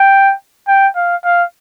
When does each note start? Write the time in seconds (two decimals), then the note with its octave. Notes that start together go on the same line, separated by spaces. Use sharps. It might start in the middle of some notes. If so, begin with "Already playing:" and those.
Already playing: G5
0.68 G5
0.96 F5
1.24 F5